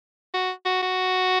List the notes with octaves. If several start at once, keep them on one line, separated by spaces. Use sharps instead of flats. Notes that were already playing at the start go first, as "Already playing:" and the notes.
F#4
F#4
F#4